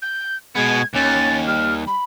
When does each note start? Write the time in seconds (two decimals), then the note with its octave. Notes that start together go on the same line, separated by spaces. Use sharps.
0.02 G6
0.56 B2 G#3 B3 G#6
0.95 D#2 C#4 A6
1.47 G3 F6
1.87 B5